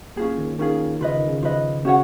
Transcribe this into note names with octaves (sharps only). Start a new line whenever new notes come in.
A#3 C#4 F4 G#4
D#3
D#3 C#4 F4 G#4
C#3 F4 B4 D#5
D#3
C#3
F3 F4 B4 D#5
C#3 C#4 F#4 C#5 F#5